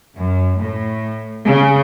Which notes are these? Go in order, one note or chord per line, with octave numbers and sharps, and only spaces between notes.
F#2
A2
C#3